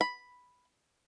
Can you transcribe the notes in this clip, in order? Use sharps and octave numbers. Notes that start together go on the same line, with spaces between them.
B5